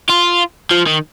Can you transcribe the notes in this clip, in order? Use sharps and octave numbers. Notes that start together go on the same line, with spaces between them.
F4
F3
D#3